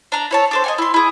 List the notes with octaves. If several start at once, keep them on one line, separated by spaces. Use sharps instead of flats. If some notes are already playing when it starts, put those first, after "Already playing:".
D4 A#5
E4 C#5 A5
D4 A4 C5
D#5 F#5 G#5
E4 C6
E4 G#4